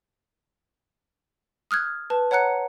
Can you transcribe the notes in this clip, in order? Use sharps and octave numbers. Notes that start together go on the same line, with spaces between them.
D#6 F6 F#6 G#6
B4 A5
C#5 F#5 A#5 F#6 C#7